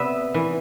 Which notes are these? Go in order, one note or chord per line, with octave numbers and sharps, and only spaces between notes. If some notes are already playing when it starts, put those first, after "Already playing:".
Already playing: C3 B3 E5
E3